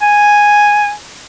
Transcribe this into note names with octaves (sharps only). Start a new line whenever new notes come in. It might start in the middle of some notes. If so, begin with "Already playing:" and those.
G#5